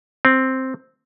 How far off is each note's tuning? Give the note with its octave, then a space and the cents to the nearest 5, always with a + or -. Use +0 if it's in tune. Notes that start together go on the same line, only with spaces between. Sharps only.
C4 +5